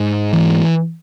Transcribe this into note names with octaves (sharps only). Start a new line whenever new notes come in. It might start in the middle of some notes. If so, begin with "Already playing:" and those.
Already playing: G#2
E3